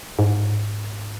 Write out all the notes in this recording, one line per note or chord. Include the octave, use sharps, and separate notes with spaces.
G#2